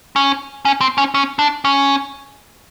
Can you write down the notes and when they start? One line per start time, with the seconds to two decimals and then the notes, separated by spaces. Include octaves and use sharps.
0.16 C#4
0.65 C#4
0.81 C4
0.98 C#4
1.14 C#4
1.39 D4
1.65 C#4